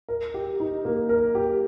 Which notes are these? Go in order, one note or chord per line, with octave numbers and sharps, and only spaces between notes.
A#4
G4
D#4
A#3
A#4
G4